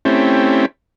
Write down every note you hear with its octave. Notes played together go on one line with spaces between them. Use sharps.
A3 C4 C#4 E4 G4